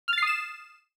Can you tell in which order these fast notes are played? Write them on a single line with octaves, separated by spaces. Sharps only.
F6 A6 C7 D#6 E7